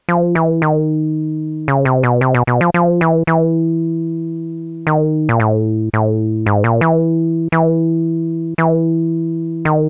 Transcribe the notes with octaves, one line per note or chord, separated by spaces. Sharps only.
F3
E3
D#3
C#3
C3
B2
C3
B2
B2
F3
F3
E3
E3
D#3
A#2
A2
A2
G#2
A#2
E3
E3
E3
D#3